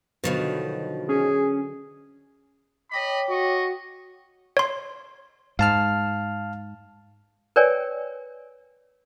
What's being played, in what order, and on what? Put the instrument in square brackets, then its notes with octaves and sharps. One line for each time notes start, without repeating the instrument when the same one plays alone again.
[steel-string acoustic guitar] B2 D#3 F3 [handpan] D3 F#3 B4
[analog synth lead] C#4 [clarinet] G#4
[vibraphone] C#5 G5 D6 [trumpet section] D#5 B5
[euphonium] F#4 [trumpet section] D#5 C#6
[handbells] C#5 C6
[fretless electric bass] G#2 [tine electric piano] F5 A5 F6
[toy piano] A#4 B4 C#5 D5 G5 G#5